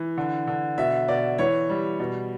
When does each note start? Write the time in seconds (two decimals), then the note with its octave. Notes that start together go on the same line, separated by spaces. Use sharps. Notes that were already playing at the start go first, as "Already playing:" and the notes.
Already playing: E3
0.18 D3
0.47 D3
0.78 B2 E5
1.08 B2 D5
1.38 E3 C#5
1.70 G3
1.99 B2